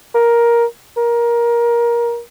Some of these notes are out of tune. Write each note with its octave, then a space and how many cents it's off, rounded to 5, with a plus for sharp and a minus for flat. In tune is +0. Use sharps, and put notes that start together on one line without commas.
A#4 +10
A#4 +20